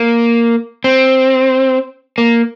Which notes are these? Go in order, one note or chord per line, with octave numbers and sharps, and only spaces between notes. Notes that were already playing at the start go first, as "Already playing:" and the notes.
Already playing: A#3
C4
A#3